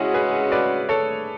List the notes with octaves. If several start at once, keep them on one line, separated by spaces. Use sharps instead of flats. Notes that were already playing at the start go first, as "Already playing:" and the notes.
Already playing: C#3 G#3 C#4 E4 F#4 G#4
G#4 B4
B4 D5
A4 C#5